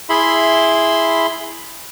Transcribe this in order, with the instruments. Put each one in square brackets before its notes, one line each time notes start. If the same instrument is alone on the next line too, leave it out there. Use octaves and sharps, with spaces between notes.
[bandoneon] E4 G#4 E5 B5 C6